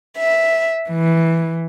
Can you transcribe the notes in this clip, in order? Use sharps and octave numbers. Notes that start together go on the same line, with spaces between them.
E5
E3